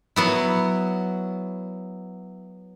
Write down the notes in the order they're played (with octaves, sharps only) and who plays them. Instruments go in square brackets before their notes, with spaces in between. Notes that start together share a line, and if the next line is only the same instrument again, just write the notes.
[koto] F#3 B3 E4